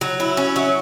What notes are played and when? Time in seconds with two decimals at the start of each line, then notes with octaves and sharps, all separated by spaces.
0.01 F#3
0.20 E4
0.37 C#4
0.56 F#3